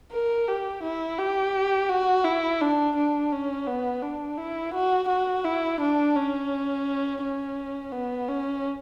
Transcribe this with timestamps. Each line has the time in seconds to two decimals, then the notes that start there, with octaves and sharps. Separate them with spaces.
0.12 A#4
0.48 G4
0.83 E4
1.18 G4
1.89 F#4
2.24 E4
2.61 D4
2.96 D4
3.32 C#4
3.67 B3
4.02 D4
4.37 E4
4.74 F#4
5.08 F#4
5.44 E4
5.80 D4
6.16 C#4
7.22 C#4
7.92 B3
8.29 C#4